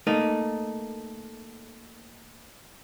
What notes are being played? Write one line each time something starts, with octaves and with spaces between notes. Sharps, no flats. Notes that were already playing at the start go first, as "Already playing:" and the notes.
A3 A#3 D#4